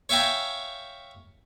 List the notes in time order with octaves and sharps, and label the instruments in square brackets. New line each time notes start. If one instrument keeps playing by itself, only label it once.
[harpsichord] C#5 E5 F5 G5 G#5 A#5